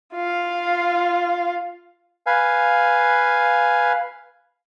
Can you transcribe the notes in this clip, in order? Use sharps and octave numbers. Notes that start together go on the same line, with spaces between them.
F4 F5
B4 F5 G#5